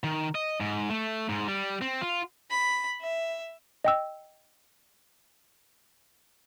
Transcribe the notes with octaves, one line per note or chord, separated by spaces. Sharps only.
D#3
D#5
G#2
A3
G#2
G3
C4
F4
B5
E5
D#5 G5 E6